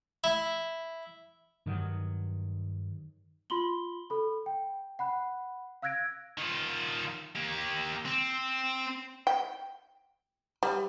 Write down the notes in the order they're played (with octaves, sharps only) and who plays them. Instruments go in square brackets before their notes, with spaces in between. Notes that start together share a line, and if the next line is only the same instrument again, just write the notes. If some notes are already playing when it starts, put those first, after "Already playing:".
[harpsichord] E4
[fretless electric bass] G2 D#3 F#3
[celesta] F4 B5 C6 F#7 G7
A4 B5
G5
F#5 B5 F#6
F5 E6 F#6 G#6 A#6 D7
[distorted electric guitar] D#3 F4
A#3 G4
C4
[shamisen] G5
G3